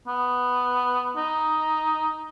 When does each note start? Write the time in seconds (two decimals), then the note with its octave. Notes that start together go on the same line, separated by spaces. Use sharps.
0.08 B3
1.17 D#4